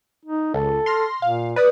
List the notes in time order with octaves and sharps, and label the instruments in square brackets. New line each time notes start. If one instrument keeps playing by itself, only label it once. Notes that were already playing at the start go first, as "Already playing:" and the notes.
[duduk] D#4
[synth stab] C#2 [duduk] A4
[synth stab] C6 F6 A#6
[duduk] A#2 [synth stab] F5
[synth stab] B4 D5 D#6